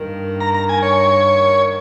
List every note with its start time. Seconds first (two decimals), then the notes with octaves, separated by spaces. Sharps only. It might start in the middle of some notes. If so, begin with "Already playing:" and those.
Already playing: G2 D#3 A#3
0.41 A#5
0.54 A#5
0.69 G#5
0.83 C#5